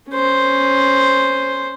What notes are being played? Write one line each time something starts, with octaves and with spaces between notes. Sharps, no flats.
C#4 C5